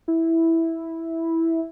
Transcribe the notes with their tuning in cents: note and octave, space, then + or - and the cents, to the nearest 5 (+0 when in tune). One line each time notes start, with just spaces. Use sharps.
E4 -5